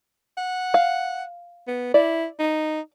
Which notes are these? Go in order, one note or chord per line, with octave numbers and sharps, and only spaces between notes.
F#5
F5
B3
E4 D5
D#4